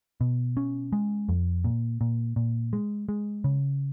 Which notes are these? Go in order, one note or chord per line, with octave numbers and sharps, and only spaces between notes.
B2
C#4
G#3
F2
A#2
A#2
A#2
G#3
G#3
C#3